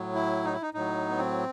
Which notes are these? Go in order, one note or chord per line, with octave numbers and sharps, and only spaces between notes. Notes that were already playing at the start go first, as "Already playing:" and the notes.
Already playing: A2 F#3
E4
D#4
E4
D#4
A2 F#3 D#4
B3
C4